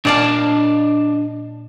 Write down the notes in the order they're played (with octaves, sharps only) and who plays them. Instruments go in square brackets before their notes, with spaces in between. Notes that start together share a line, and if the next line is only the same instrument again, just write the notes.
[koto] A#2 D5 F5 [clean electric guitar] D4 D#5 A5